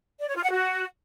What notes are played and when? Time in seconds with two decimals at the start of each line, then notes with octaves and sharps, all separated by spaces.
0.19 D5
0.27 C#5
0.35 F4
0.43 F#5
0.51 F#4